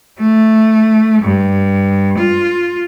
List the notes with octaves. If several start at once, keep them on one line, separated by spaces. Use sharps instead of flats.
A3
G2
F4